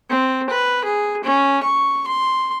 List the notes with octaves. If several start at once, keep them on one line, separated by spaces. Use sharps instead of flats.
C4
B4
G#4
C#4
C#6
C6